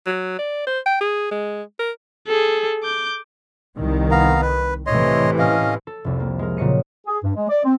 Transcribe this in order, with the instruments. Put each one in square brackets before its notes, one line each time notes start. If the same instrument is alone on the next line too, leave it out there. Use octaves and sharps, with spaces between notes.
[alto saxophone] F#3
D5
C5
G5
G#4
G#3
A#4
[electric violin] G#4 A4
D6 G6
[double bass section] C2 D#3
[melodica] B3 F5 A#5
B4
[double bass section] A2 C3 E3 [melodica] C#5 D#5 C6
[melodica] C#4 D#5 F5
[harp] A4
F1 C2
A#3
G#3 A#4
A#2 C#3 F#3 D#5 C#7 D#7
[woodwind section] G#4
G2
G#3
D5
C4